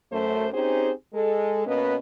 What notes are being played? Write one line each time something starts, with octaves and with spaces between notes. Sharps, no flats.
F#2 A3 C5
C4 C#4 D#4 G4 G#4 C5
G#3 A4
B2 A#3 B3 C#4 B4 D#5